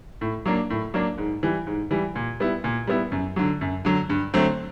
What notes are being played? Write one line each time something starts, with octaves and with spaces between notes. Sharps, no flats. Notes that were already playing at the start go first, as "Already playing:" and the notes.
A2
F#3 A#3 D4
A2
F#3 A#3 D4
G#2
E3 G3
G#2
E3 G3
A#2
G3 B3 E4
A#2
G3 B3 E4
F#2
D3 F#3
F#2
D3 F#3
G2
D3 F#3 A3 C4